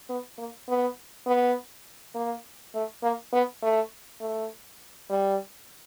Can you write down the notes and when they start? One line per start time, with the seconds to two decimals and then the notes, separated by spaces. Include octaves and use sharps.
0.09 B3
0.38 A#3
0.68 B3
1.26 B3
2.15 A#3
2.74 A3
3.03 A#3
3.32 B3
3.62 A3
4.20 A3
5.10 G3